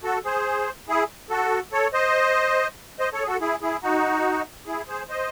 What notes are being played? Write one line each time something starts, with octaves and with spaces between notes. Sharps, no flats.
F#4 A4
G#4 C5
E4 G#4
F#4 A4
A4 C#5
C5 D#5
C5 D#5
A4 C#5
G#4
F#4 A4
E4 G#4
E4 G#4
D#4 F#4
E4 G#4
G#4 C5
C5 D#5